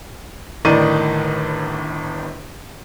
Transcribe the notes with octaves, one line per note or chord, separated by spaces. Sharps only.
G1 A2 D#3 D#4 D5 D#7